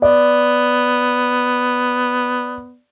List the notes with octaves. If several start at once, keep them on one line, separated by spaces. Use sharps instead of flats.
B3 D5